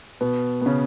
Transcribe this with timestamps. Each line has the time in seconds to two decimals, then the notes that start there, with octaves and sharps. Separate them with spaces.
0.21 B2 B3
0.62 B3
0.66 C#3 C#4